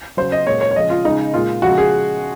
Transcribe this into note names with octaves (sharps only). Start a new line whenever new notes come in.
C#3 F#3 C5
D#5
A#2 G#3 C#5
C#5
C#5
C#3 F3 G#3 D#5
F4
C#3 G#3 D#4
A#2 G#3 F4
C#3 F3 G#3 F#4
G#4